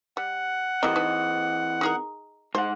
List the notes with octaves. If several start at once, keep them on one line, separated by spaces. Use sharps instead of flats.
G3 F#5
E3 G3 C4 A#4 D#5
D#4 B4 A5
D#4 G#4 A#4
G#2 C5 F#5